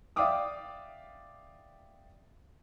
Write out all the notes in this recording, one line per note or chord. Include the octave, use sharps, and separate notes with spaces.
D5 E5 F5 G5 D6 D#6